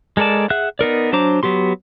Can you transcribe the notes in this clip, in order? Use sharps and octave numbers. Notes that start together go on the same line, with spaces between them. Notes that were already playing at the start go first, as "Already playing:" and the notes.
G#3 A4 A#4 D5 A5
G#4 E5 F#5 F#6
B3 D#4 A#4 D5
F#3 D4 C5 A#5 D6
F#3 B3 G4 C6